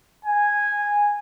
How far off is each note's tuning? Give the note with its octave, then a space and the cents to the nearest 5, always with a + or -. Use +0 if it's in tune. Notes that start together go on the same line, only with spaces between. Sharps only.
G#5 -10